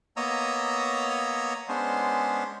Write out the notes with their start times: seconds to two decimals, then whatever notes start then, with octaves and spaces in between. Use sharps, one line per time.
0.16 A#3 B3 C#5 D#5 A#5 E6
1.68 G#3 B3 C#4 D4 C5